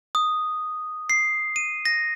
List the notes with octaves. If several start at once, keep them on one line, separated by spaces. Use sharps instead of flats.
D#6
C7
D#7
A#6